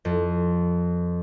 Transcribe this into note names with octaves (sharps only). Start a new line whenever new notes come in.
F2